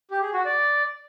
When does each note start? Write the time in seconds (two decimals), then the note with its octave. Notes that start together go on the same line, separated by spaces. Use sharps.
0.11 G4
0.22 G#4
0.34 F#4
0.45 D5